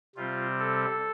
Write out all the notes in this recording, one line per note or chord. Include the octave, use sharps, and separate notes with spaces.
C3 G3 C4 F4
A4